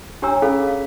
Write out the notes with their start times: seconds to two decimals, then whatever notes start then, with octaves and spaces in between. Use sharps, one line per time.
0.22 D4 G4 C#5 G#5 A#5 E6
0.42 C#4 G#4 A4 F5 B5
0.68 F5